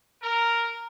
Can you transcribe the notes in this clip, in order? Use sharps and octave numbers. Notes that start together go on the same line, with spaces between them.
A#4